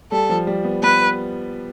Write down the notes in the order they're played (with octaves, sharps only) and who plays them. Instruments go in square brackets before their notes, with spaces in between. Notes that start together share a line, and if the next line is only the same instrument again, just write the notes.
[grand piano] G3 [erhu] A4
[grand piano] F3
G3
B3
[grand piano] B3 [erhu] B4